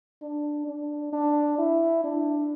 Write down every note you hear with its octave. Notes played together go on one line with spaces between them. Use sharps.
D4
D4
D4
E4
D4